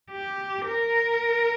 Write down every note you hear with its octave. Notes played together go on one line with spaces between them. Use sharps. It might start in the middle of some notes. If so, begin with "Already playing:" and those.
G4
A#4